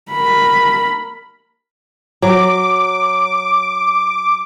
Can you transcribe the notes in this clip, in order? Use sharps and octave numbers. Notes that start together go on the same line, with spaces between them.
A#4 B5
F#3 D6